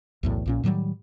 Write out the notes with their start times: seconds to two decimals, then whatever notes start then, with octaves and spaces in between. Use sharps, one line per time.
0.23 B1 E2 A2
0.46 A#1 A#2 C#4
0.64 A2 D#3 F#3 G3